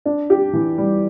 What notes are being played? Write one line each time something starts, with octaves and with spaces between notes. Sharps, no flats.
D4
G4
E3
G3